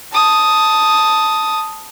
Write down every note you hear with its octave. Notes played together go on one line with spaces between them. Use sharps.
A5 D#6